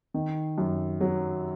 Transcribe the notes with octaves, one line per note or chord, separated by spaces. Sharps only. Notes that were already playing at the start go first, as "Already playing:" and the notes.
D#3
F#2
F#3